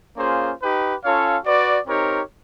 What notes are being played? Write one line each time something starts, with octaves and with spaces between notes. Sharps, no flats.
A#3 C#4 F4 G#4 C5
D#4 G4 B4
C#4 F4 A4 C#5 F5
F#4 B4 D5
C4 D#4 G4 A#4 C#5